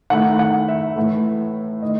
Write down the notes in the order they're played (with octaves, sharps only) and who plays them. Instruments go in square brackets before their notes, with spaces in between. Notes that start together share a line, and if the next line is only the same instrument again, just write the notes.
[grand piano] D#3 A3 E4 F#5
F#5
E5
A2 E3 A3
D#3 A3 D#5